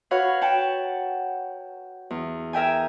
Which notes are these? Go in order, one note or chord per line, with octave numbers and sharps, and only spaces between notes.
F#4 B4 C#5 F5 F#5
F#5 G5 A5
E2
A#4 E5 G5 G#5